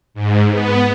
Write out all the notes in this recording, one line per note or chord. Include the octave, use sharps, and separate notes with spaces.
G#2
B3